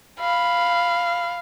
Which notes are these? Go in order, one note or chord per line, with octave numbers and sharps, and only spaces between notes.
F5 B5